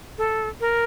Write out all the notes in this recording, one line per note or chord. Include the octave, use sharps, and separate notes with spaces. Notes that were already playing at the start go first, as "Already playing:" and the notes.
A4
A#4